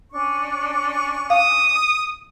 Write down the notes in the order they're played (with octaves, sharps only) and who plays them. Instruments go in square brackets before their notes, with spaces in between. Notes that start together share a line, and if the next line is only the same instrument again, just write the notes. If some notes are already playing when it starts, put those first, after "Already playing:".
[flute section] C#4 D4 C#6
[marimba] F5 [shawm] D#6